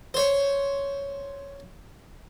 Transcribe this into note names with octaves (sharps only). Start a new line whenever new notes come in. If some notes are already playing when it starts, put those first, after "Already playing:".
C5 C#5